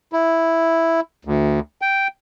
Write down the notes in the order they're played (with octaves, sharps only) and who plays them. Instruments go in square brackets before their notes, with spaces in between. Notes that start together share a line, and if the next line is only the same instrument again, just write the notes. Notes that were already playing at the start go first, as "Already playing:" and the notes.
[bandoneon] E4
D2
G5